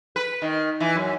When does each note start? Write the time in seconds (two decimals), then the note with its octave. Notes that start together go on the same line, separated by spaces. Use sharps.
0.16 B4
0.42 D#3
0.80 E3
0.96 F#2